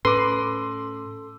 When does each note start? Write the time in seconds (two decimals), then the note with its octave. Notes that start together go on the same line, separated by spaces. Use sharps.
0.05 A2 C#4 A4 B4 C6 D6